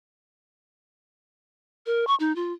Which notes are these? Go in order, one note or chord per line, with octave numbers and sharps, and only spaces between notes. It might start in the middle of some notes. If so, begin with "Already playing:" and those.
A#4
C#6
D#4
F4